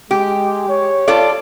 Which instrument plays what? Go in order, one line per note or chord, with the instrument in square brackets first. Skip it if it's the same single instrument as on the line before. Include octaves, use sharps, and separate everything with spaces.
[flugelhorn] G#3 [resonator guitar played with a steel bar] G4
[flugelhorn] C#5
[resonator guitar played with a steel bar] F4 A4 D5